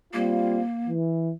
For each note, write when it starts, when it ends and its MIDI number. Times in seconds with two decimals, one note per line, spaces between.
0.13 0.60 55
0.13 0.89 58
0.13 0.60 60
0.13 0.60 65
0.87 1.31 52